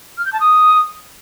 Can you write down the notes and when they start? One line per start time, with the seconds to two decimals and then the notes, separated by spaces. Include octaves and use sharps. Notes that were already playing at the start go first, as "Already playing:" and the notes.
0.18 F6
0.25 G6
0.33 A5
0.40 D#6